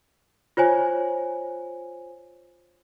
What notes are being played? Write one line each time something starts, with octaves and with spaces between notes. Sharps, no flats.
F4 C5 C#5 G#5